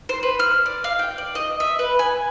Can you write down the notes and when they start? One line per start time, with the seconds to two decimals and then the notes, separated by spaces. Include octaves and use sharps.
0.09 C5
0.23 B4
0.39 F6
0.66 D5
0.84 F5
0.99 G5
1.18 D5
1.35 D#5
1.60 E5
1.79 B4
1.99 G#5